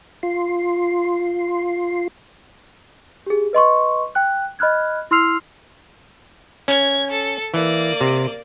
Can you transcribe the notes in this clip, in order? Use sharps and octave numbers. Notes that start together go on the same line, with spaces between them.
F4 C6
G4 G#4
B4 D#5 C6 C#6
G5 F#6
D#5 B5 F6 F#6 G#6
E4 C6 E6 F6 C7 F7
C#4 G#6
A4
E3 A#3 D5
C3